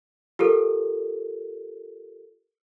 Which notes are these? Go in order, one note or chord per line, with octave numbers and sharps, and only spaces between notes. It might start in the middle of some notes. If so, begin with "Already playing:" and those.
F4 G4 A4 A#4